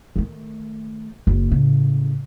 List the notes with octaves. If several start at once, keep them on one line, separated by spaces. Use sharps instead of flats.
D#3 A3
F#1
A2 C#3